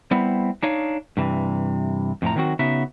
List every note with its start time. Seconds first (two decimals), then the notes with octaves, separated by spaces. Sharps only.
0.11 G3 B3 C4 E4
0.63 D4 D#4 C#5 F5
1.17 G2 C3 E3
2.22 F2 A2 F3 A#5
2.36 D#3 F#3 C4 F#4
2.59 C#3 B3 D#4 F#4 E5